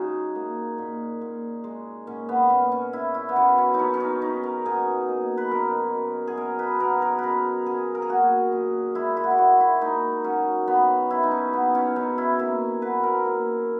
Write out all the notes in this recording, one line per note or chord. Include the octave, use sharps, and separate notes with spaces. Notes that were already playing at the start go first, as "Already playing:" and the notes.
Already playing: C#3 G#3 D#4 F#4 G#4
A#3
A#2
A#2
G#3
A#2 C#4
B3
A#2 C#4
C#4
C#3 E4
E4
B3
F#3 C#4
C#4
D#4
F#2 C#4
C#4
D#4
C#3 D#4
A#4
B2 G#4
A#3
B4
F#2 A#4
F#2
G#4
B2 A#4
B4
B2 A#4
A#4
C#3 A#4 B4
C#3 G#4
A#4
G#4
A#3 F#4
A#2
G#3 E4
E4
F#4
E4
G#3 F#4
E4
A#3 D#4
F#3 C#4
F#2 B3
F#2 E4
D#4
C#4
C#3 B3
C#4
F#2 D#4
E4
A#3 E4
F#3 B4
A#4
A#3